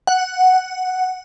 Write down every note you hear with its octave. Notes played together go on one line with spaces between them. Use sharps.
F#5